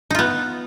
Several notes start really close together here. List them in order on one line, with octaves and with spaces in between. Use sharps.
D#4 F4 B3